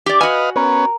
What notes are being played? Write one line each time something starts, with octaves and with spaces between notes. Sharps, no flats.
G4 D5
F#4 B4 D#5 F5 G#5
B3 C#4 A#4